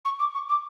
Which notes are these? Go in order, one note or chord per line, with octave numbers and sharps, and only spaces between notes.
C#6
D6
C#6
D6